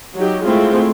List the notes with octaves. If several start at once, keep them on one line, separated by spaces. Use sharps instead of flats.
F#3 D#4 G4
G#3 A3 C4 E4 F4